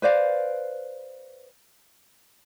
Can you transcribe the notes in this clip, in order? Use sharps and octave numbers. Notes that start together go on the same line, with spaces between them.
B4 C5 D5 F5